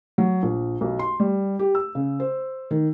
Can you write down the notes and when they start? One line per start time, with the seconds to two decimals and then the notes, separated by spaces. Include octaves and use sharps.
0.18 F#3
0.43 A#1
0.81 B1
0.99 C6
1.20 G3
1.59 G4
1.75 E6
1.95 C#3
2.20 C5
2.71 D#3